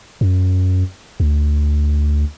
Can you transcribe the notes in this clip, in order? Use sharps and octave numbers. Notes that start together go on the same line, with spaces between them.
F#2
D2